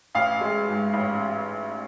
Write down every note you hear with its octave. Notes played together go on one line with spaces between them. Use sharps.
A1 F5
G#3
G#2
A1